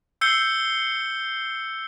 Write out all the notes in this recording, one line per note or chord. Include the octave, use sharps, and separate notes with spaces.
E6 G6 C7 C#7 G7